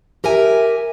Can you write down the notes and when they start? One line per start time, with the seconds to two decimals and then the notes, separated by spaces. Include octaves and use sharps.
0.24 G4 A#4 E5 G#5